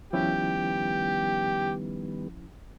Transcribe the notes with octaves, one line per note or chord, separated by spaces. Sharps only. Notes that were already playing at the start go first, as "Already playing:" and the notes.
D#3 F3 G3 B3 C#4 E4 G4